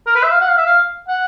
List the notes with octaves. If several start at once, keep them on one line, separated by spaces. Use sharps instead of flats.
A#4
B4
E5
F5
F#5
F5
E5
F5
F#5